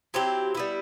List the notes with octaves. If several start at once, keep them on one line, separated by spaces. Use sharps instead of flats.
F#3 C4 E4 G4
G3 B3 E4